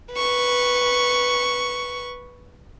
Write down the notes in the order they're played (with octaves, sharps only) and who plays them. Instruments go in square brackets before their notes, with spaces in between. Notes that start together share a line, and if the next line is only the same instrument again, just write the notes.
[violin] B4 C#6